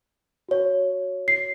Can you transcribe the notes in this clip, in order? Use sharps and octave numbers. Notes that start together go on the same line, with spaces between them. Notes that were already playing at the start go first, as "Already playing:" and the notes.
F#4 C#5
C7